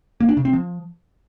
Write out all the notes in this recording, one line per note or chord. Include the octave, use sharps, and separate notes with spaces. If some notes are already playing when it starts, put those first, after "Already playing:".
A#3
D4
C3
C4
F3